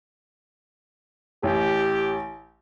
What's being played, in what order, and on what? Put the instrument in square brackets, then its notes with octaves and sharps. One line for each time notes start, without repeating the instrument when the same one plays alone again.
[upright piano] A1 [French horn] G4